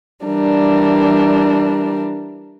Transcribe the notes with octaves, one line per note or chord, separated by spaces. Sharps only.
E3 G3 D4 A#4